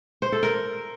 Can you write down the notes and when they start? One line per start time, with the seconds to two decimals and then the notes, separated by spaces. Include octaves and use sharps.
0.22 C5
0.32 A4
0.43 A#4